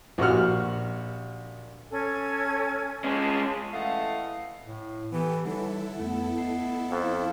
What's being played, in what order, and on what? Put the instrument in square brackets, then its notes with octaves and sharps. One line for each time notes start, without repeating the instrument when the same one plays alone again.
[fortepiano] A#1 F#4 G4 F#5 F6
[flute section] C#4 A4 G#5
[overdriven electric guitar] G#3 C#4 [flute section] A5
[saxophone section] E3 D#5 F#5 [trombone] A3 [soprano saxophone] F5
[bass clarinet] A2
[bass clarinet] E3 [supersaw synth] B3 G4 A4
[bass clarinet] D3 [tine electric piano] G3 D#4 C#5 [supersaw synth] E4 A4
[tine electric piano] F2 A3 [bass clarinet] B3
[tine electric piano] D#5 C7
[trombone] F2